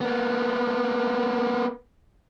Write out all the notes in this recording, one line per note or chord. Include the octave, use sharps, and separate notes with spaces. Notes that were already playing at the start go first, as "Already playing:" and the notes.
A#3 B3